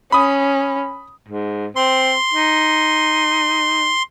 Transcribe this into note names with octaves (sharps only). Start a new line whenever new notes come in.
C#4 B5 D#6
G#2
C4 C6
D#4